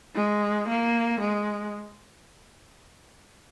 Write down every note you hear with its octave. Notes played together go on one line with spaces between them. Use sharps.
G#3
A#3
G#3